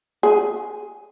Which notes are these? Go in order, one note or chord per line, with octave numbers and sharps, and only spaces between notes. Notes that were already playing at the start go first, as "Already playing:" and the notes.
G#4